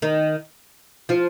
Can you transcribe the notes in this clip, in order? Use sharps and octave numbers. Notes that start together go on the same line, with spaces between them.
D#3 D#4
F3 F4